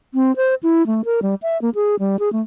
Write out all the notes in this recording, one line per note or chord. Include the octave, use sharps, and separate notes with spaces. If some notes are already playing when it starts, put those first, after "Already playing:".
C4
C5
E4
A3
A#4
G3
E5
A#3
G#4
G3
G#4
A3